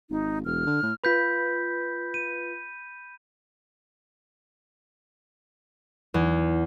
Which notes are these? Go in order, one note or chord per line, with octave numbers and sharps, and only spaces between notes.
G#1 D#4
E1 F6
D3
A2
F4 B4 B5 G6 B6
D#7
E2